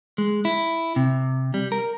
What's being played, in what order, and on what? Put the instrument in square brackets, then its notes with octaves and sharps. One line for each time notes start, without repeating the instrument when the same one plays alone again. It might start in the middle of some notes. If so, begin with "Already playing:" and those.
[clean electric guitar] G#3
E4
C3
G3
A#4